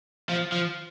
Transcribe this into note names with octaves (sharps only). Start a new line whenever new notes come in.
F3
F3